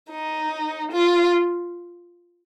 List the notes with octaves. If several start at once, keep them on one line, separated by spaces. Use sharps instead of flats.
D#4
F4